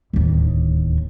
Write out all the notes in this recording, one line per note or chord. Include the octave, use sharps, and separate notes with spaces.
D1 D#2